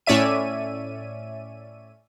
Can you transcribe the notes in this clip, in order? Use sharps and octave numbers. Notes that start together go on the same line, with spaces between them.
A2 C#4 C#5 D5 E5 D#7